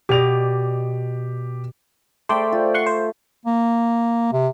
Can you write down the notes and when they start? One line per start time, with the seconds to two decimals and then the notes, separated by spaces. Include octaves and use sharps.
0.09 B2 G4 D5 D#5 F7
2.29 A3 C5 D5 G5 B5
2.52 F4
2.74 F#5 C6 C#6
2.86 C5
3.46 A#3
4.32 C3